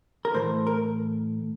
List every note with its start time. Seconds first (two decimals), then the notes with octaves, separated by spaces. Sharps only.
0.25 A#4
0.34 A2 E3 A3 C5
0.67 A#4